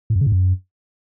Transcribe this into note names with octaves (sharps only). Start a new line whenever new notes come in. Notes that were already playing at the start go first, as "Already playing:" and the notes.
A2
F#2
C#3
G#2
F#2